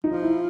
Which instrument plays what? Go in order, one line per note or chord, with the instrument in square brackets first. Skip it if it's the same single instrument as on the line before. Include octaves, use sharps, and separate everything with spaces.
[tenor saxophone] F3 [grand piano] D#4
[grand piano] E4